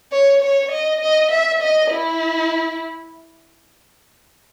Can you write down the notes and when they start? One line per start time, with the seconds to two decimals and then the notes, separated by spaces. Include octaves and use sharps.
0.12 C#5
0.42 C#5
0.72 D#5
1.01 D#5
1.31 E5
1.61 D#5
1.90 E4